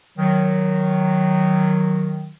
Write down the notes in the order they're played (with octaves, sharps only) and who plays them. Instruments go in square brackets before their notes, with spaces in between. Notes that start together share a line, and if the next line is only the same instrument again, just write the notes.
[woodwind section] D#3 F#3